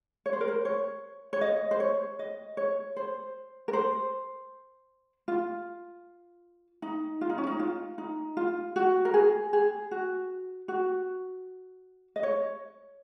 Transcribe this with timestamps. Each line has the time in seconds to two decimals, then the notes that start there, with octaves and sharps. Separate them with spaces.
0.26 C#5
0.33 C5
0.41 A#4
0.48 C5
0.65 C#5
1.33 C#5
1.41 D#5
1.71 C5
1.80 C#5
2.19 D#5
2.57 C#5
2.96 C5
3.68 A#4
3.73 C5
5.28 F4
6.82 D#4
7.21 F4
7.30 D#4
7.38 C#4
7.47 D#4
7.59 F4
7.98 D#4
8.37 F4
8.76 F#4
9.05 A#4
9.14 G#4
9.53 G#4
9.91 F#4
10.68 F#4
12.16 D#5
12.23 C#5